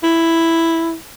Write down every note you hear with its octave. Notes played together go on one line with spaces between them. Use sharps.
E4